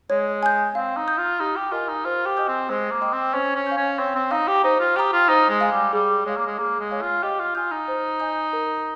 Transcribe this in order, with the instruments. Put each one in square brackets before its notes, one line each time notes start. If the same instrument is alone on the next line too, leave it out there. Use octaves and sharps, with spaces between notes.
[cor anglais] G#3 [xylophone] C#5
[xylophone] G#5 D#6 G6
[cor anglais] C4 [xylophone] F5
[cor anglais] D#4
[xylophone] A#5 D#6 G6
[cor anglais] F4
[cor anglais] D#4 [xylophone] G4
[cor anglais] G4
[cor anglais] F4 [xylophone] A#4 D#5 G#5
[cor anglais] D#4
[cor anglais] F4 [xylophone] C5
[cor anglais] G4
[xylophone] D#5 G#5 D#6 G6
[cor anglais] C4
[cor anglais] G#3 [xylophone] C5
[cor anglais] A#3
[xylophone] D#5 G5 C6 D#6
[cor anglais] C4
[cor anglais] C#4 [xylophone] C5
[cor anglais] C#4
[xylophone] F5 G#5 C#6 G6
[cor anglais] C#4
[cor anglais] C4 [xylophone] C#5
[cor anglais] C4
[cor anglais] D#4 [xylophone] F5 A#5
[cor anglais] G4
[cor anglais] D#4 [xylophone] C5
[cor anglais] F4
[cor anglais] G4 [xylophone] G5 A#5 D#6
[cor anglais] F4
[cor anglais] D#4 [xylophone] C5
[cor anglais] G#3
[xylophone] F5 G#5 C6
[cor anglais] G3
[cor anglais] G3 [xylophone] G#4
[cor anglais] G#3 [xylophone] C#5 F5
[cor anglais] A#3
G#3
[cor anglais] A#3 [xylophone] G#4
[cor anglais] G#3
[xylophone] C#5 F5 G#5
[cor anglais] F4
[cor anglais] G4 [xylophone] D#5
[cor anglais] F4
[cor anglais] F4 [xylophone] G#5 D#6 G6
[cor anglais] D#4
[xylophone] C5
D#5 G#5 D#6 G6
A#4